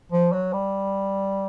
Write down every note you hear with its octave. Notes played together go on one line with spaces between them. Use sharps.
F3
F#3
G3